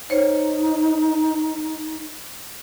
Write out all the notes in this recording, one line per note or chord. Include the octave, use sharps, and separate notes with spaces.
D#4 C5 C#5